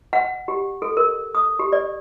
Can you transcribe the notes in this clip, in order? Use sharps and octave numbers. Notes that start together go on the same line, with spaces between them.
F#5
G4
A4
A#4
D#6
G4
D5